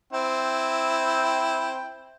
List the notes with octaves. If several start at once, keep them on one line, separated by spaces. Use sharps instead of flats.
C4 E4 G5